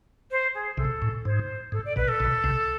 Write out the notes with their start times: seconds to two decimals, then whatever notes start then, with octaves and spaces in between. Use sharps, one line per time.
0.31 C5
0.54 G#4
0.77 C2 C3 A4
1.02 A2
1.25 G#2 C5
1.72 G#2 A4
1.85 D5
1.96 B1 B2 B4
2.08 A4
2.20 B1 B2
2.44 C2 C3